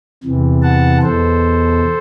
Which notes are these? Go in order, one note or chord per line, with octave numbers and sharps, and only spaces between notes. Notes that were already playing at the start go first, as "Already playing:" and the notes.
E2 C3 E3
F#5 A5
E2 B2 A4 C5